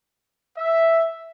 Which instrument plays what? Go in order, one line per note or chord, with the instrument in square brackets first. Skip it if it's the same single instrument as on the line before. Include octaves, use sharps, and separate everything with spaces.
[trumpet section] E5